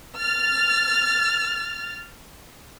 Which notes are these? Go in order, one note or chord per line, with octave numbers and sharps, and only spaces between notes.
F6 A6